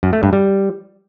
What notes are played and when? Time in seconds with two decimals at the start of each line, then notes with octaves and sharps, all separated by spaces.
0.03 F#2
0.13 A3
0.23 G2
0.33 G3